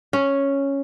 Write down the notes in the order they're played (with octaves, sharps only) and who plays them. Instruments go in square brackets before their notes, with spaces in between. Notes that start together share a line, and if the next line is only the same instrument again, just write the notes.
[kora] C#4